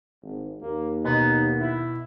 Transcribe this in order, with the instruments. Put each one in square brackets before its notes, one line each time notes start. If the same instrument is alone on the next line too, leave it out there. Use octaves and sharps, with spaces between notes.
[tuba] G#1
[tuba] D#2 [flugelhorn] A#3
[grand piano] B2 [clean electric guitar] B3 [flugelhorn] D#4
[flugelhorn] E4